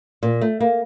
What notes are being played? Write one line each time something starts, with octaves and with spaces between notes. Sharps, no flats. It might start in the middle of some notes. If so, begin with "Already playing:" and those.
A#2
A3
A#3